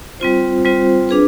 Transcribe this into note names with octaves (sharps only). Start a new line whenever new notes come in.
G3 C4 F4 C5
G3 C4 F4 C5
D4 G#4 B4